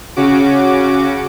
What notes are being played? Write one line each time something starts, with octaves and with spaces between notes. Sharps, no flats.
C#3 C#4 F#4 D6